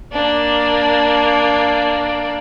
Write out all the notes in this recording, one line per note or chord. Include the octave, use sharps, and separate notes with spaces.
A#3 D4